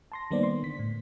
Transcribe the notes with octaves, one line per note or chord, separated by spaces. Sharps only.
A5 C6 A#6
D#3 G3 A#3 B3 C5 D5
C6
D3 B6
A2